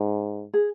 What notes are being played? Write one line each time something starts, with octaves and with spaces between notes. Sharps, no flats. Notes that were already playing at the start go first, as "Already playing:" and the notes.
Already playing: G#2
G#4